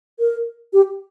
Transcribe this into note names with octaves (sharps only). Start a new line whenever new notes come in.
A#4
G4